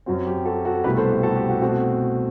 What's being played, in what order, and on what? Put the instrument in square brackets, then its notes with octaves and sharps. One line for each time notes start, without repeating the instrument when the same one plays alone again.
[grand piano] F#2 F#3 C4 F#4
G4
F#4 A4
F#4 A4
C2 B2 A3 G4 B4
A4 C5
G4
F#4 A4
G4
F#4
B2 A3 C4 F#4